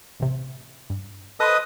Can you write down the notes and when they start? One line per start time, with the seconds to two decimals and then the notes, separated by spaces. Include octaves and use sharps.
0.20 A1 C3
0.90 G2
1.40 A4 B4 C5 D#5 D#6